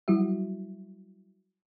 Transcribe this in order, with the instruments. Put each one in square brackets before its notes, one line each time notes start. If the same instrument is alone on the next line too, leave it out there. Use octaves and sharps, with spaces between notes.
[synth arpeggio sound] F#3 G3 E4 F#4 E5